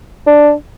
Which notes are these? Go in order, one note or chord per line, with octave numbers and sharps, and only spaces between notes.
D4